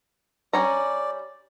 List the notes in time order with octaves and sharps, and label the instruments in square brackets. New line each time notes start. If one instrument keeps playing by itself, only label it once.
[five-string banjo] G3 C#4 A#5 [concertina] D5